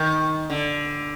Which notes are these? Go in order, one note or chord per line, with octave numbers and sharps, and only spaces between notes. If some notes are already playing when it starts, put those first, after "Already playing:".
Already playing: D#3
D3